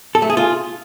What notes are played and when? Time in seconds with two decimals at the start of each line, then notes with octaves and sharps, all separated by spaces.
0.15 A4
0.22 A3
0.30 G#4
0.37 F4